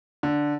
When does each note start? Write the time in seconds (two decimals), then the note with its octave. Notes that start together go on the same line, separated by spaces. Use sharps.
0.23 D3